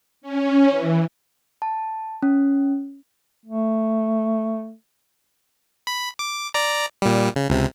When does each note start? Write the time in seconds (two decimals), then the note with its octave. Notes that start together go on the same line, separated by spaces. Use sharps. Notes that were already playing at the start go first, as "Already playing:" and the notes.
0.21 C#4
0.70 E3
1.62 A5
2.23 C#4
3.45 A3
5.87 B5
6.19 D6
6.54 D5 A#5
7.02 A#2 G3
7.36 C#3
7.50 C#2 C3